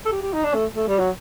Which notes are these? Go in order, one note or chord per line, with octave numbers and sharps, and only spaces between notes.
A4
G4
G4
D#4
D4
A3
A3
G3
F#3